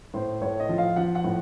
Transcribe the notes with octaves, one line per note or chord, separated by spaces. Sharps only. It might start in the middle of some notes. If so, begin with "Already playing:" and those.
A2 C5
A2 C#5
D#5
F3
F5
F3 F#5
F#5
A2